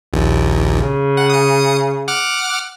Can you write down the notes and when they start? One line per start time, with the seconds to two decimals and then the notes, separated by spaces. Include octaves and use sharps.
0.13 A#1 D#2
0.75 C#3
1.17 F#5
1.30 D#6 C#7
2.08 F#5 D6 F6